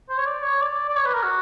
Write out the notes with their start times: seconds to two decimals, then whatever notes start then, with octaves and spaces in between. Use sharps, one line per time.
0.09 C5
0.18 C#5
0.26 D5
0.43 C#5
0.61 D5
0.89 D5
0.96 C#5
1.05 B4
1.14 A#4
1.23 F#4